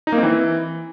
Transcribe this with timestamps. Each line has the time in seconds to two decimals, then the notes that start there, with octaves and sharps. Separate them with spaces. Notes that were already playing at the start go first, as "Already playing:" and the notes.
0.07 D#4
0.12 A#3
0.18 C4
0.23 E3